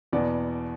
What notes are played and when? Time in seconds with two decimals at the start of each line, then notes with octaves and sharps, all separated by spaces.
0.13 E2 B2 B3 D5